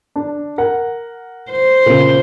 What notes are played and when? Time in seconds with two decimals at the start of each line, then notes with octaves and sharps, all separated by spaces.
0.16 D4
0.58 A#4 F#5
1.51 C5
1.86 A#2 C#3